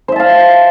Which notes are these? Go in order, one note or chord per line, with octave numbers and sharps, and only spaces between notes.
C5 E5 F5 A5